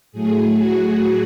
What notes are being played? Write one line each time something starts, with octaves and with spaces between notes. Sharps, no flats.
A2 F#3 A3 G#4
F#4